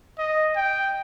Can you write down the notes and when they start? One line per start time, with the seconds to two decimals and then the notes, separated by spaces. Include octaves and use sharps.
0.18 D#5
0.56 G5